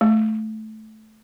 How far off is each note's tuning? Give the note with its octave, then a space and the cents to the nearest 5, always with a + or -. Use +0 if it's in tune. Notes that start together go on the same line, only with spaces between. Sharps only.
A3 -10